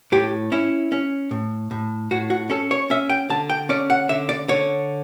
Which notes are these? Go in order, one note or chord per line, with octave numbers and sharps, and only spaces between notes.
A2 G4
C#4 E4
C#4
A2
A2
A2 F#4
F#4
C#4 A4
C#5
C#4 E5
G5
D3 A5
G5
C#4 D5
F#5
D3 E5
D5
D3 C#5